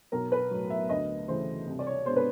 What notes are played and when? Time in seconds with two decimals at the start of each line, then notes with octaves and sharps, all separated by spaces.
0.12 B1 A#4
0.32 B4
0.51 A2 F#3
0.70 E5
0.89 D2 D#5
1.28 C#3 E3 A3 C5
1.67 C2
1.79 D5
1.86 C#5
2.06 B2 G#3 B3 D4 C5
2.16 B4